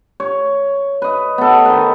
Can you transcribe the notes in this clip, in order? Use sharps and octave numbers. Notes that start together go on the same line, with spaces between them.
C#5
B4 D#5
B3 A4
D#3 B4